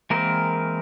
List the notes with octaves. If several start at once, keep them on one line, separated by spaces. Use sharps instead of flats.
E3 G#3 A#3 C4 A#4